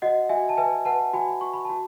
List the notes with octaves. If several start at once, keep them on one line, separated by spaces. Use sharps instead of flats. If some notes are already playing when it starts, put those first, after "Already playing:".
F#4 D#5 F#5
F#4 E5 G#5
A5
B4 E5 G#5
B4 F#5 A5
F#4 G#5 B5
F#4 C#6
B5
F#4 A5